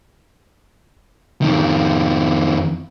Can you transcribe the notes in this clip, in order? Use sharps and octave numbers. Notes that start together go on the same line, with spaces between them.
F2 D#3